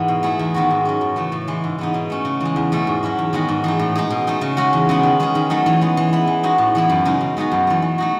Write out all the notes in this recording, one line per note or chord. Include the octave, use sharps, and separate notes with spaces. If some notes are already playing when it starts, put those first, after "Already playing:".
Already playing: G#2 E3 B3
B2
A3 E4 G#4
E2
D#3 G#3 B3 F#4
G#2
F#3 C#4
F#2
C#3 E3 A3
A2
E3 G#3
G#2
E3 B3 D#4
B2
A3 C#4
C#3
E3 G#3
E2
B2 A3 C#4 G#4
G#2
F#3 C#4 E4
E2
D#3 G#3 B3 F#4
G#2
E3 A3 D#4 G#4
A2
G#3 D#4 G#4
B2
A3 D#4 G#4
C#3
G#3 C#4 F#4
E2
C#3 G#3 B3
D#3
G#3 C#4 G#4
D#3
F#3 A3 D#4
E3
G#3 B3
E3
B3 E4
E3
G#3 D#4 F#4
A2
E3 B3 E4
F#2
C#3 G#3 D#4
B2
G#3 B3 D#4 F#4
F#2
E3 A3
E3
A3 D#4 F#4